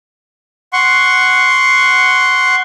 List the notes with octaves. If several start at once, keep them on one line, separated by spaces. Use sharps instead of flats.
F#5 C6 C#6